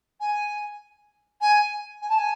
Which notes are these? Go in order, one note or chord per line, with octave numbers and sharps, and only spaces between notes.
G#5
G#5
G#5
A5
G#5